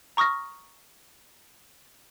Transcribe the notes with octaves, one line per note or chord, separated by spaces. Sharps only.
A#5 C#6 D#6 F6 A#6